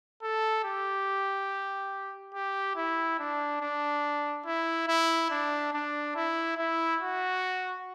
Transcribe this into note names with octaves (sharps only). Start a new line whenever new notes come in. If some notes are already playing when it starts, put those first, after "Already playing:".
A4
G4
G4
E4
D4
D4
E4
E4
D4
D4
E4
E4
F#4